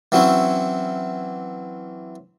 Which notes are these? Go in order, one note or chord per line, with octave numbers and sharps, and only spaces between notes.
E3 F#3 C4 C#4 E4